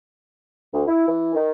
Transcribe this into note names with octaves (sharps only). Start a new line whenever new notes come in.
D2
E4
E3
D#3